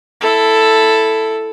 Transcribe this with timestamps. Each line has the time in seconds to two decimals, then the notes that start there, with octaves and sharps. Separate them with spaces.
0.21 E4 A4